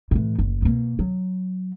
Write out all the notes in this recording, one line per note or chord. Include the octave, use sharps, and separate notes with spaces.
A2 E3
F#1
B2 A#3
F#3